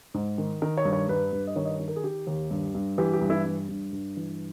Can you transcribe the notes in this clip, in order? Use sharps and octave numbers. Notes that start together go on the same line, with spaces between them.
G#2
D#3
D#3 A#4
C#5
G2
C#5
G2 B4
G2
D#5
D#3 C#5
D#5
C#5
D#3
A#4
G#4
D#3 G4
D#2
G2
G2
E3 G4
G4
G2
E4
G2
G2
G2
E3